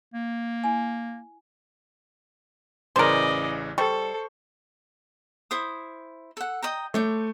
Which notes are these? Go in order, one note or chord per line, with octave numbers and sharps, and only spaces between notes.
A#3
E4 G#5
A1 C#3 E3 A#4 C5 D5 D#5
G3 A4 C5 C#6
E4 C5 D#6
A4 F#5
D#5 G5 A#5
A3 C5 C#5 D6